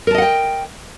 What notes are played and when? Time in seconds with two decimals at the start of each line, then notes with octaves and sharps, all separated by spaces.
0.07 A#4
0.11 A5
0.14 D#5
0.18 F#5
0.22 G5